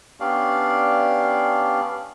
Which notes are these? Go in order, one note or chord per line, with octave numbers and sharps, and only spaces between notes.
B3 C#4 D4 G4 D5 F5